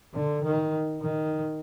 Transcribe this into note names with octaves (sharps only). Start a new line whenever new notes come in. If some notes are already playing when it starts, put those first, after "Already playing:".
D3
D#3
D#3